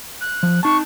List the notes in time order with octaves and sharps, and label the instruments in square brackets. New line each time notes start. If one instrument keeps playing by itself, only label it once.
[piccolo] F#6
[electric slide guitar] F3
[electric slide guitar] D#4 A5 [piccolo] C#6